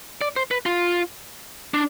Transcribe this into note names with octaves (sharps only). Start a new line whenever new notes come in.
D5
C5
B4
F4
D4